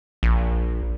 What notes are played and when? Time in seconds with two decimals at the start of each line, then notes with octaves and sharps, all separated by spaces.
0.23 A#1